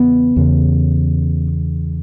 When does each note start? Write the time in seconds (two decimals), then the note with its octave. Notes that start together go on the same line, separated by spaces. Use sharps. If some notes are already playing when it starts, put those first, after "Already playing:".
Already playing: E2 C#3 B3
0.36 E2 C#3